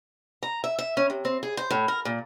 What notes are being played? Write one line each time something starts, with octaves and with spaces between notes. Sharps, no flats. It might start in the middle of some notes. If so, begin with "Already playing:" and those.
A#5
E5
E5
C#4
C3
C4
G#4
C5
A2
A#4
A#2